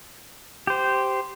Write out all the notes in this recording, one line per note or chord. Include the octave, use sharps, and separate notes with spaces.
G4 C5